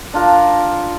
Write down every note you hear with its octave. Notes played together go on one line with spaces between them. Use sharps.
D4 F4 A#4